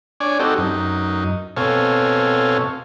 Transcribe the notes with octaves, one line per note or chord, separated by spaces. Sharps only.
D4 C#5 D5 G#5
C4 D#4 F#4 G4 A4
F#2 D#4
B2 C4 A4 C#5 F5 G#5